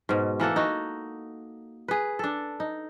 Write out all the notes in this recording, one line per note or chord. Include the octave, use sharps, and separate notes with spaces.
G#2 B2
E3 A#3 A4 F#5
D#4 F#4
G#4 B4
D4 A4
D#4